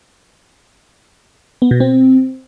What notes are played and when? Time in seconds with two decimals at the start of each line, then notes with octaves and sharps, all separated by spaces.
1.62 B3
1.71 B2
1.80 C4